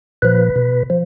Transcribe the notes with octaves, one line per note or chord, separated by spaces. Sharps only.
A#2 F3 B4
B2
F3